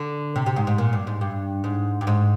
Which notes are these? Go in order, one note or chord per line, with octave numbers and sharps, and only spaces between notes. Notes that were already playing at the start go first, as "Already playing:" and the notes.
Already playing: D3
C3
C3
G#2
G#2
A#2
G2
G#2
G2
G#2
G2
G#2